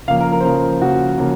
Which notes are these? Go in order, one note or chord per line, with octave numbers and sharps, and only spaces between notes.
C#3 F3 A#3 F5
A#4
A#4
C5
C#3 F3 A#3 A#4
C#3 F3 A#3 F#4
C#3 F3 A#3